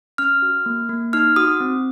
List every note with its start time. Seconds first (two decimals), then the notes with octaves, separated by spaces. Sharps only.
0.18 C#4 F6
0.42 F#4
0.66 A#3
0.89 A#3
1.13 D#4 F6
1.36 F#4 D#6
1.60 C4